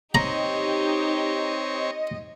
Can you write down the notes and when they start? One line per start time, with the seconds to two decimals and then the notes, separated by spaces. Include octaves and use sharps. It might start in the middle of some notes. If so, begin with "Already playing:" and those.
0.15 C4 D#4 G4 C#5 D#5 A#5